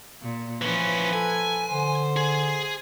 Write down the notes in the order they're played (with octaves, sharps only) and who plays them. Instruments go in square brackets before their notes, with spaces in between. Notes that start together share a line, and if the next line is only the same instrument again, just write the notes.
[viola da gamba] A#2
[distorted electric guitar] E3 C#4 [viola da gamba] F3 B4
[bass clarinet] A4 [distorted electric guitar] G#5
[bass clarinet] D3 [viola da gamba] C5
[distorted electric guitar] G#4